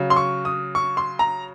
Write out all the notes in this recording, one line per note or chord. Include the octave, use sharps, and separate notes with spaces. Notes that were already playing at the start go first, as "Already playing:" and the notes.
Already playing: C#3 F#3
C6
C#6
D#6
C#6
C6
A#5